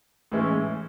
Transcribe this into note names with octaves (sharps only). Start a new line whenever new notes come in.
A2 E3 G#3 C#4 E4